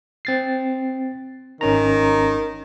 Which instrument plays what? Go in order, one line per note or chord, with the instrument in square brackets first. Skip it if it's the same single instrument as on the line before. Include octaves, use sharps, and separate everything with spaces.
[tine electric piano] C4 A6 C7
[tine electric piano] G#1 C#4 A#5 [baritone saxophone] D#3